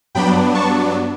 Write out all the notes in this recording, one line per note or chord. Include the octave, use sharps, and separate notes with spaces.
G2 F#3 B3 D4 G5 B5
A5 C#6